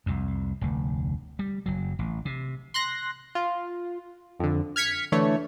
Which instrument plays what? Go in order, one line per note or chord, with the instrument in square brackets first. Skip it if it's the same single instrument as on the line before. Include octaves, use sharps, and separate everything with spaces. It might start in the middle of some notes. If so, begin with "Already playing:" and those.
[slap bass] C2 F2
F1 D2
G3
F#1 F#3
A1
C3
[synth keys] C6 F#6 A#6
F4
F2 D3
F6 G#6 B6 C#7
D3 E3 A3 C#5